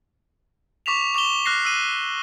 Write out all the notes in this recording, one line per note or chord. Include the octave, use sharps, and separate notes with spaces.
C#6 D6 B6 E7 F7
C#6 D6 E7 G7
D6 F6 F#6 A#6 C7
E6 D#7